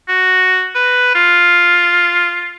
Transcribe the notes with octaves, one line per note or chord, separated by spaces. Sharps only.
F#4
B4
F4